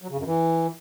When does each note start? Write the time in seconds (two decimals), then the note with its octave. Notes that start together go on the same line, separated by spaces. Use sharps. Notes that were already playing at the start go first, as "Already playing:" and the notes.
0.02 F#3
0.10 C#3
0.18 F#2
0.26 E3